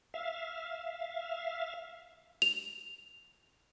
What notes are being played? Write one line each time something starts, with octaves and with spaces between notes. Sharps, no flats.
E5 F5
F7